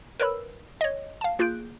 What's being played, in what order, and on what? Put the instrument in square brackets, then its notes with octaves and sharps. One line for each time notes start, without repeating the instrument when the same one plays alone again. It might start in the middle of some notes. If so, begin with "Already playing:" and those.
[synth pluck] A#4 B4 C#5 B5 E6
C#5 D#5
F5 A5
A#3 F4 G#4 F#6 G6 D7